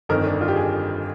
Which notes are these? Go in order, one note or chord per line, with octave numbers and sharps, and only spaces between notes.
G1 F2 D#3 A#4
D4
D#4
F4
G4
G#4